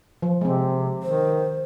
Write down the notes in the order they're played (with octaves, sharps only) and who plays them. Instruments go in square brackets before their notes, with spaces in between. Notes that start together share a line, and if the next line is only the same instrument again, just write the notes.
[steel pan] F3
[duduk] C3 [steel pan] G#3 C4
[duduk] D#3 [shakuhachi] C5